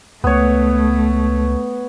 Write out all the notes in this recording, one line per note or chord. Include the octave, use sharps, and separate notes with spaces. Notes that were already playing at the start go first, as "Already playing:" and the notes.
C#2 A3 B3 C#5